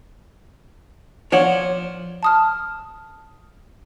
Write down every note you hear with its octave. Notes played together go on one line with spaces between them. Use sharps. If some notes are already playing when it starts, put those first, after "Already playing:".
F3 C#5 D5 F#5
A5 D#6 F6